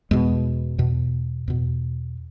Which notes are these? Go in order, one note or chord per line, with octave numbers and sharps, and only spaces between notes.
E2 B2 G#3
E2 B2
E2 B2